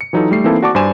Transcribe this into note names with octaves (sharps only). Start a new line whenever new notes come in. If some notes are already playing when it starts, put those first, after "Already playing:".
C#7
E3 F#3 D#4 F4 A4
G3 A3 C7
E3 A#3 C4 D#4 E4 A4
F#4 D5 A5 C#6 D6
G2 C5 D5 G#5 E7